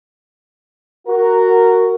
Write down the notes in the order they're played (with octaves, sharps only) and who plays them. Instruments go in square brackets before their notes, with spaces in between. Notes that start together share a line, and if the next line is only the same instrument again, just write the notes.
[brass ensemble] F#4 A#4